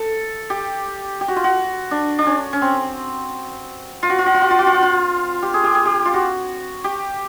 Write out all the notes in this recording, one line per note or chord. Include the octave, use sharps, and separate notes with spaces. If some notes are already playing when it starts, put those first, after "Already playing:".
Already playing: A4
G4
G4
F#4
F4
F#4
D4
D4
C#4
C#4
C4
F4
F#4
F4
F#4
F4
F#4
F4
F#4
F4
F#4
F4
G4
G#4
G4
G#4
G4
F4
F#4
G4